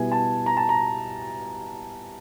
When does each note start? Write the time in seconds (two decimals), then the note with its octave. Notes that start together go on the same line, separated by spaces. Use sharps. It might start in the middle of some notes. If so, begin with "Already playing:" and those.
Already playing: B2 G3 B3 E4 G#5
0.12 A5
0.46 A#5
0.57 A5
0.69 A#5